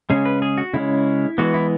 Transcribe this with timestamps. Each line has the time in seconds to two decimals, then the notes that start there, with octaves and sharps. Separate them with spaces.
0.10 C#3 G#3 C#4 G#4
0.25 B4
0.42 G#4
0.58 F#4
0.74 C#3 G#3 C#4 E4
1.38 E3 G#3 B3 F#4
1.54 E4